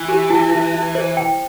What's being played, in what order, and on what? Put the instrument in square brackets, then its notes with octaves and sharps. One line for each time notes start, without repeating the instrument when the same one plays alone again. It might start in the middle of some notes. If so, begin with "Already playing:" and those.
Already playing: [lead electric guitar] E3
[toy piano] G4
E4
E4
E4
C5
G5